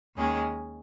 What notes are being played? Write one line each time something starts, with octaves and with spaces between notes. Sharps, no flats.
D#2 D#3 G#3 C#4 G#4